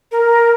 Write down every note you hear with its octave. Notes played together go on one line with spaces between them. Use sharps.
A#4